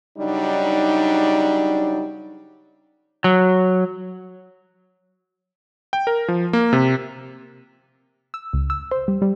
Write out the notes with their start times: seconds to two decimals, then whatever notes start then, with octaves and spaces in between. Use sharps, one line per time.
0.18 C#3 F#3 G3 D4 D#4
3.24 F#3
5.93 G5
6.07 A#4
6.28 F3
6.53 A#3
6.73 C3
8.34 E6
8.53 C#2
8.70 E6
8.91 C5
9.08 G3
9.22 G3